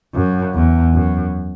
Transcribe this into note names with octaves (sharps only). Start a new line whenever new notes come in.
F#2
E2
F#2